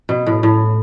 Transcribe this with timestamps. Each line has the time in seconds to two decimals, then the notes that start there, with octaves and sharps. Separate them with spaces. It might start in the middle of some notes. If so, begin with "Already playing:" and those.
0.09 B2
0.27 A2
0.43 A2